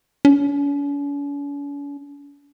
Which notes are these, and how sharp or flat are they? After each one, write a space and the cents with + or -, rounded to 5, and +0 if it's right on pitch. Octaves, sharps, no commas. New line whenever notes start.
C#4 +45